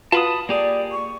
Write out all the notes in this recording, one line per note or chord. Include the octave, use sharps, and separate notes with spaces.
F4 F#4 B4 A5 B5 D#6
A#3 G4 G#4 D5
C#6